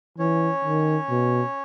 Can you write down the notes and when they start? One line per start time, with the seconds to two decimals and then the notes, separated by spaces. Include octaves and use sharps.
0.18 E3 C#4 C#5
0.65 D#3
1.10 B2